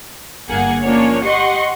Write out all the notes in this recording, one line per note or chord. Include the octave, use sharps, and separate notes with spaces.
G1 A#3 G#4 F#5 G#6
F3 A#3 C#4 D4 C#5
G4 D#5 F#5 C6 C#6